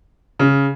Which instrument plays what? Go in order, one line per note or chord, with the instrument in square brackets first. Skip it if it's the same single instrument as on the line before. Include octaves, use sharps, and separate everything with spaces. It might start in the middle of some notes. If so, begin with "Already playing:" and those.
[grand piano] C#3